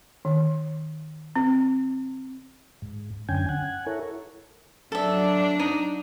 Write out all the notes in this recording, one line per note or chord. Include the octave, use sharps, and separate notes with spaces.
D#3
C4
G#2
F#2 D3 C#4 G5 G#5
F#5 G#5
E4 A4 A#4 C#5
F#3 D4 A4 E5
D#4